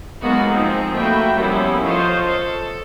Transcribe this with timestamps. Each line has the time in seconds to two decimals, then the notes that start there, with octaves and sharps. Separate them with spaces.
0.22 F#3 G#3 A#3 B3 D#4 F#4
0.50 F3 C4 D#4 G#4
0.95 A3 A#3 F#4 B4 E5 G5
1.36 F#2 F3 G3 B3 C#4 E4
1.85 F4 A4 C5 C#5 D#5
2.23 A4